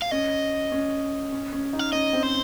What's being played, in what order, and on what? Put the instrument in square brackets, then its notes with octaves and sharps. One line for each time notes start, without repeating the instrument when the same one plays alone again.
[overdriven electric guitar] F5
[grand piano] C#4 [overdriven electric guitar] D#5
[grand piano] C#4
C#4
C#4
D#4
[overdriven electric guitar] F5
[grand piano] C#4 [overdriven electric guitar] D#5
[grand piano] C4
[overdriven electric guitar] C5